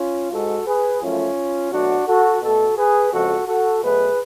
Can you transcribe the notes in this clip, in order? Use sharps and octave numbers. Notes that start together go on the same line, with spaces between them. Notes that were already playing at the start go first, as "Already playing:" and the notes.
Already playing: C#4 F4
G#2 G#3 F#4 A4
G#4 B4
F#2 F3 A3 C#4 F4
B2 F#3 A3 D4 F#4
F#4 A4
B2 A3 F#4 A4
G#4 B4
F2 C#3 F3 G#3 F#4 A4
F#4 A4
B2 F#3 A3 G#4 B4